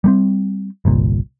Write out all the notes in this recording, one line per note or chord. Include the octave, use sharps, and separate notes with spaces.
G3 A3 C4
G1 C2 A#2